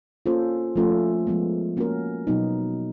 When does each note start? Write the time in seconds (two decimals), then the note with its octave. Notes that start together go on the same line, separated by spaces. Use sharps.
0.26 A#3 C#4 F4 A4 C5
0.76 F3 A3 C#4 F4 A4
1.27 F3 G#3 B3
1.77 A#3 C#4 F#4 A#4
2.27 B2 F#3 B3 D#4